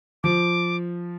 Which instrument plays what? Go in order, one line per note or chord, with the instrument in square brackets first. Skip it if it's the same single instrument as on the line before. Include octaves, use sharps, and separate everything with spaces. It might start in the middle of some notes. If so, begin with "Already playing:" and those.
[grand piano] F3 [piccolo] D6